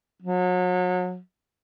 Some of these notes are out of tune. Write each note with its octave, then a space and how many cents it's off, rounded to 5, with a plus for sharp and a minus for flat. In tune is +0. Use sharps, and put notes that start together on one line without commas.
F#3 -35